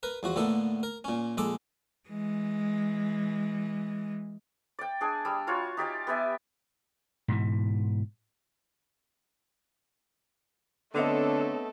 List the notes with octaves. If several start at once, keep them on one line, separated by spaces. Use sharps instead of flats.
A#4 B4
E2 F3 F#4
A2 D3 A#3 B3 A4
A#4
A#2 C#4
A#1 G#3 A4 D6
E3 G#3
D5 G5
D4 G#4 G#5
G3 E6
F4 F#4 C#5
D#4 G4 D5 G#5
B3 G4 E5 G#5
G#2 B2 E3
D3 A3 B3 C4 D4 A4 C#5 D#5